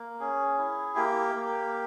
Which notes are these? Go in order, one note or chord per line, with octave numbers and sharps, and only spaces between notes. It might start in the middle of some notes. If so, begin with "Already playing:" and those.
Already playing: A#3
C#4 G#4
E4
A#3 G4
A#3